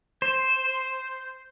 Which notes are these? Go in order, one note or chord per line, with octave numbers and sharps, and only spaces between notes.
C5